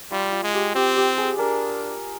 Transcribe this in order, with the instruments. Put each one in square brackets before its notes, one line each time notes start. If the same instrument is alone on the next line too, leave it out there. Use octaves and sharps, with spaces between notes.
[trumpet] G3 [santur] F4
[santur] F4
[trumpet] G#3
[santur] G4
[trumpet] C4 [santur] G4
[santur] G4
G#4
[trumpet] D4 [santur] A#4